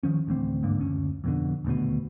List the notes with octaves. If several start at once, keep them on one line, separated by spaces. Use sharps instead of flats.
D#3 F3 C#4
D1 D2 E3 C4
G1 G#2 D3 A#3
F#1 D2 C#4
F2 B2 D3
D#1 D2 B2